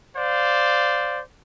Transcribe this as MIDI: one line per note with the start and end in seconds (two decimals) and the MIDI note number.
0.17 1.20 72
0.17 1.20 74
0.17 1.20 77